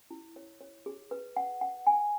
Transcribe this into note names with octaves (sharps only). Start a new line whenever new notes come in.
E4
C#5
C#5
G#4
B4
F#5
F#5
G#5